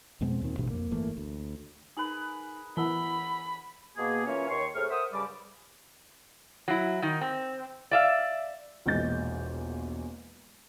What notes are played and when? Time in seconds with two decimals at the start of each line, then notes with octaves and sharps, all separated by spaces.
0.21 F2 B2 G#3 C4
0.42 D#2 A#2 D#3 C4
0.58 A1 D2 G2 B2
0.71 F2 A#3
0.91 G1 E3 A3 A#3
1.17 D2
1.97 D#4 G#4 A#4 B4 F#7
2.77 E3 F#5 B5 E6 G7
3.97 B2 A#3 G#4
4.26 E3 A#3 C#4 F4 C#5
4.49 D#2 C#5 C6 C#6
4.75 A2 C3 G#4 C#6 F6
4.90 A#4 C5 E5 F#5 D#6
5.12 G2 C#3 G3 D5 B5 D6
6.68 F#3 E4
7.02 D#3 D#4
7.21 C4
7.91 D5 E5 F5
8.86 E1 A#1 E2 D#5 G6 A6